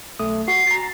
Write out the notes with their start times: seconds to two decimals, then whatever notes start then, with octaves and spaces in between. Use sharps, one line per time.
0.19 B1 A3 D#6
0.48 F#4 C7
0.67 A#5 A6